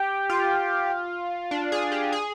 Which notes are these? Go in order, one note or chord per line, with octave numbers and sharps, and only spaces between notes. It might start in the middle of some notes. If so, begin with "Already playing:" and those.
Already playing: G4
F4
D4
G#4
G4
G#4